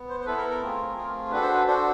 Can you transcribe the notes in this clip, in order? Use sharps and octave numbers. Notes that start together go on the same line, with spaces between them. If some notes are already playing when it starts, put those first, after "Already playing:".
Already playing: B3
C5
C5
B3 E4 A4 B4
A#4
A#4
A3 C4 F4 G#4
A3 C4 F4 G#4
D4 F#4 A4 B4
C5
B4
D4 F#4 A4 C5